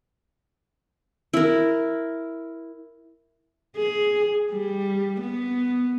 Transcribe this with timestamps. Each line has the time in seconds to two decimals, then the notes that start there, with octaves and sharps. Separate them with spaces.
1.34 E4 A#4
3.76 G#4
4.51 G3
5.21 B3